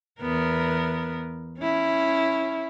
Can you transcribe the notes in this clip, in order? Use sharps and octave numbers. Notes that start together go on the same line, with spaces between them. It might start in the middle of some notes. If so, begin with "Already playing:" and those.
E2 B3 A#4
C#4 E4